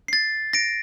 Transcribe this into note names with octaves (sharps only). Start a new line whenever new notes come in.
A6 C7
A#6 D7